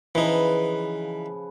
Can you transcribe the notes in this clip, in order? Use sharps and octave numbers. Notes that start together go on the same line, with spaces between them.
C#3 E3 F3 D#4 B4